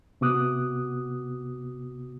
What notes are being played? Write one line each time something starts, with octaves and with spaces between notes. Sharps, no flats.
C3 B3 F#4 D6 D#6 F#6